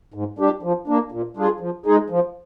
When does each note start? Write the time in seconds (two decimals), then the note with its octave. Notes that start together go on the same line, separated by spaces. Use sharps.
0.14 G#2
0.38 G3 D4 G4
0.63 F3
0.87 A#3 D4
1.12 A#2
1.37 G3 D4 F4 G#4
1.60 F3
1.86 G#3 D#4 G#4
2.10 F3